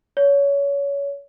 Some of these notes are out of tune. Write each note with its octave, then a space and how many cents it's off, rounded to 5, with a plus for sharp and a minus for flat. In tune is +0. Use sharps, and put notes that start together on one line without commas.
C#5 +25